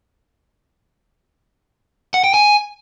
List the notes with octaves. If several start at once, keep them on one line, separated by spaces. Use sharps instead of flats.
F#5
G5
G#5